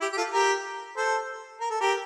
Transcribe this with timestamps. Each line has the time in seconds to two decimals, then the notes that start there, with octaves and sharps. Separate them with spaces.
0.01 E4 G4
0.12 G4
0.17 F4 A4
0.33 G4 A#4
0.97 A4 C5
1.60 A#4
1.70 A4
1.81 G4 A#4